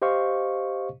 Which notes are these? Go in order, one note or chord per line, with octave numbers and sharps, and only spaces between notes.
G4 C5 D#5 F5 C#6